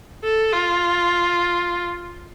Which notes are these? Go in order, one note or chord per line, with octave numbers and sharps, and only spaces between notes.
A4
F4